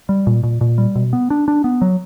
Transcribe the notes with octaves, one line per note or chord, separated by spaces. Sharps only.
G3
A#2
A#2
A#2
G3
B2
B3
D4
D4
B3
F#3